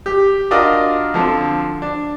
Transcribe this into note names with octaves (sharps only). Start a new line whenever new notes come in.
G4
D4 F4 F#4 A#4 D5 D#5
D3 F3 C4
D4